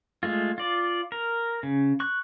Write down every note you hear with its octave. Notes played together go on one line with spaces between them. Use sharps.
G#3 A3 F4
F4 D5
A#4
C#3
C#6 F#6